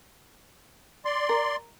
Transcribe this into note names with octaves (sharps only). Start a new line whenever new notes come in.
D5 C6
A#4